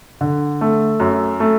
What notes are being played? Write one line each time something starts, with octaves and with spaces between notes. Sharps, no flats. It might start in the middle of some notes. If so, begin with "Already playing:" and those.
D3
A3
F#2
A3